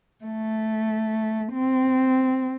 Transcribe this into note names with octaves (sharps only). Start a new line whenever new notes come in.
A3
C4